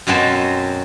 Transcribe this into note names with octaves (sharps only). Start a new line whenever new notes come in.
F#2 B2 F#3 C4 A5